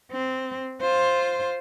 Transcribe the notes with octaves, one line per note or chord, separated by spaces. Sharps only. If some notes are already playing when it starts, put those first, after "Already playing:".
C4
F4 C5